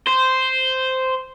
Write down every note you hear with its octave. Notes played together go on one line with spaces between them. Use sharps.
C5